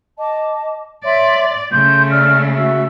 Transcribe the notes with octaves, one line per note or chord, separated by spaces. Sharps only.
D#5 A5 D6
C#5 D5 E5 C6
C#3 A3 C6 G6
D5 E6 F6
F#4 E5 E6